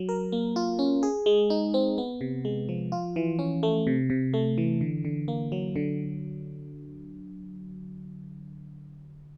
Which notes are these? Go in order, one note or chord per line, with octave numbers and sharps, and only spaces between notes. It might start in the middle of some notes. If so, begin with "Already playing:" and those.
Already playing: F#3
A#4
A#3
F4
C#4
G#4
G#3
D#4
C4
B3
C3
G#3
F3
F4
E3
C#4
A3
C3
C3
A3
E3
D3
D3
A#3
F#3
D3